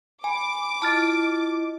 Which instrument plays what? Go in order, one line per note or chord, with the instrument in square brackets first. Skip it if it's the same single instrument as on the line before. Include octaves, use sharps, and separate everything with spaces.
[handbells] G#5 [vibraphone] B5 [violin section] D6
[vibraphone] E4 F4 D#5 [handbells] A5 F6 A6